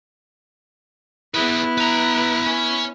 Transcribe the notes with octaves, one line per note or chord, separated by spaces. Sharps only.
B3 E4 G#4 B4
B4 A#5
C#4